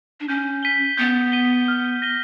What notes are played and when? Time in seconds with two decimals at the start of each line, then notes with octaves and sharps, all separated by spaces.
0.20 D4
0.28 C#4 G6
0.63 B6 D#7 G7
0.97 B3 G6
1.32 B6 D#7 G7
1.68 F6
2.02 A#6 D#7 G7